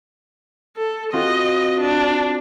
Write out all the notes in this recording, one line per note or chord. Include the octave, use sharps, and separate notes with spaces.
A4
C4 F4 F#4 D#5
D4